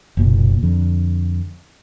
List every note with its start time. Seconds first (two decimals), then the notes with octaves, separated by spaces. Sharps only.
0.17 F#1 B1 A#2
0.63 F2 D3